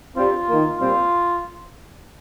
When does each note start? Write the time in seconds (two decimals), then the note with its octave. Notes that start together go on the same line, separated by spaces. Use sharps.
0.16 G2 G3 C4 F4
0.48 D#3 A#3
0.79 A#2 G3 C4 F4